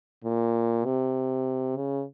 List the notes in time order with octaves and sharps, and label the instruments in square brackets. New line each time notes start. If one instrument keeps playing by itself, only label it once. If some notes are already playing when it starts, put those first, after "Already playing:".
[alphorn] A#2
C3
C#3